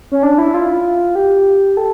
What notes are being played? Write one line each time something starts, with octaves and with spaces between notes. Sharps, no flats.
C#4
D4
E4
F4
G4
A4